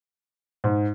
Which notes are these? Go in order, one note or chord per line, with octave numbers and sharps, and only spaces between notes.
G#2